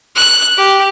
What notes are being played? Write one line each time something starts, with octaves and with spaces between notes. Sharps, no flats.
F#6
G4